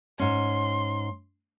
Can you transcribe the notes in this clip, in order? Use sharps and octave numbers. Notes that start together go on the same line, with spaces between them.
G#2 C#4 C6